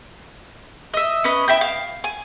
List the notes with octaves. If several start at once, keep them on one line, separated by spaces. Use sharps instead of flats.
D#5 E5
C#4 B4 D#5
E4 E5 G5 G6
F5
G#5